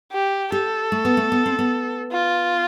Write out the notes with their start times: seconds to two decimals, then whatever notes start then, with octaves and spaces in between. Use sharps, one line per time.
0.12 G4
0.52 G4 A4
0.92 A3
1.05 B3
1.17 A3
1.32 B3
1.46 C4
1.59 B3
2.12 F4